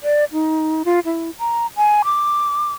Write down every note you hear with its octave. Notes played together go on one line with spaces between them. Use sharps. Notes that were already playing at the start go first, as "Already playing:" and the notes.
D5
D#4
F4
E4
A#5
G#5
D6